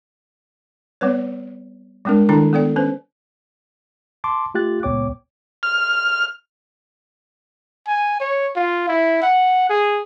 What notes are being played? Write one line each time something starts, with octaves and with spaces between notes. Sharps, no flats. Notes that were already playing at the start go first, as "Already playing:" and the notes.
G3 B3 C4 B4 C#5
G3 G#3 C4 D4 A#4
D#3 G3 D4 E4 G5 A#5
B3 A4 D5 G5
C#4 B4 C5
A5 C6 D6
A3 F4 G4 F#6 A6
C#2 A#2 B3 C#5 G5 D6
F6
G#5
C#5
F4
E4
F#5
G#4